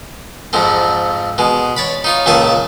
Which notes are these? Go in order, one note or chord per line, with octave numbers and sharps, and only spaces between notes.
F2 G#2 F3 C4
B2 G#3
C#5 D5 B5
D#4 F4 C#5
C#2 A#2 D#3 E5 G#5 A5